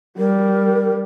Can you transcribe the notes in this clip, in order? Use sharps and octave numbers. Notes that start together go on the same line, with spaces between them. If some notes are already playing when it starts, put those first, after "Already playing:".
G3 A#4